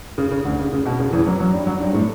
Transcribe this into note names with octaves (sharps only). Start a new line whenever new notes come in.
C#3
C#3
D2 D3
C#3
C#3
B2
C#3
E2 E3
F#2 F#3
F#2 F#3
G2 G3
F#2 F#3
G2 G3
A2 A3